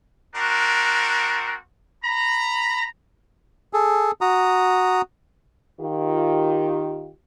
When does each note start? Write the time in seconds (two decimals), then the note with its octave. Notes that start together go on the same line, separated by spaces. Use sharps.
0.36 C4 D4 F#4 A#4
2.04 A#5 B5
3.73 G#4 A4
4.21 F#4 A#5 D#6
5.81 D#3 F4 G4